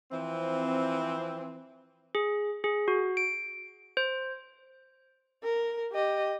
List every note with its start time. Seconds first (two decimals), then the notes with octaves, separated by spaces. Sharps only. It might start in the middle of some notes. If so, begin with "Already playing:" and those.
0.10 E3 F3 C4
2.15 G#4
2.64 G#4
2.88 F#4
3.17 D7
3.97 C5
5.44 A#4
5.93 G4 D#5